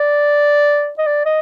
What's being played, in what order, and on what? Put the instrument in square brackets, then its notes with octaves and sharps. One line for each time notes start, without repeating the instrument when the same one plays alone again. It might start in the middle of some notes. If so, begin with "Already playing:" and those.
Already playing: [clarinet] D5
D#5
D5
D#5